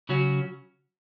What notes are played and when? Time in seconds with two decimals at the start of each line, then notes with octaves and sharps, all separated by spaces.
0.09 C#3 F#3 C#4 F#4